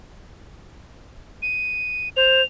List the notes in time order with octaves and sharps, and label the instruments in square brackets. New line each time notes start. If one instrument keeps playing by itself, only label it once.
[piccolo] D#7
[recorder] C5 [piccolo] F7